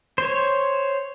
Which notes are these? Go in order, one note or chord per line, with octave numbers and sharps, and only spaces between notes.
C5 C#5